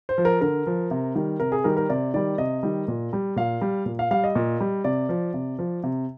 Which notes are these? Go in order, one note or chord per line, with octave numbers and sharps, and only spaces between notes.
C5
F3
A#4
D3 A#4
F3
C3
D#3 G3
C3 A#4
G#4
D#3 G3 A#4
A#4
C3 D5
D#3 G3 D5
C3 D#5
D#3 G3
A#2
G3
A#2 F5
G3
A#2
F5
G3 F5
D#5
A#2
G3
C3 D5
F3
C3
F3
C3